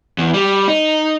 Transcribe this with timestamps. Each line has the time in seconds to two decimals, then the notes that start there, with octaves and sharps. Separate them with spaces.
0.18 E2
0.34 G3
0.68 D#4